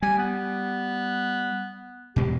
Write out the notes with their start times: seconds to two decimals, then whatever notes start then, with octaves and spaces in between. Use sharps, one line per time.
0.02 G3 G#5
0.18 B3
2.16 E2 B2 G#3 G4